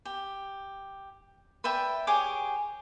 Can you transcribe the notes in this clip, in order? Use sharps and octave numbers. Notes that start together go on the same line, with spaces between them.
G4
B4 D5 E5 G5
G4 G#4 C#5 D6